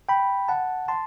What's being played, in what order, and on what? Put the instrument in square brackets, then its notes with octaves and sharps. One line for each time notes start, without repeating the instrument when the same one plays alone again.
[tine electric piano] G5 B5
F#5 A5
A5 C6